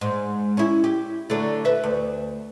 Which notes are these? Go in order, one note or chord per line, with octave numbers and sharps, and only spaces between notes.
G#2
C#4 E4
G4
D3 F#3 A3
B4 E5
D2